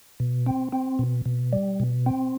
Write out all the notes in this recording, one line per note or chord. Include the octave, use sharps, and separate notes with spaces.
B2
C4
C4
B2
B2
G3
B2
C4